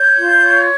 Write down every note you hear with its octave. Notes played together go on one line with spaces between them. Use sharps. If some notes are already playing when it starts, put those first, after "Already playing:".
Already playing: C#5 G6
F4
C#5